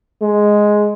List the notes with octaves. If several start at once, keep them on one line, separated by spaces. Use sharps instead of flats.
G#3